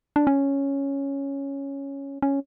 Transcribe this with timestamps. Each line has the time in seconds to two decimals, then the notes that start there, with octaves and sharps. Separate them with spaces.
0.16 D4
0.27 C#4
2.22 C#4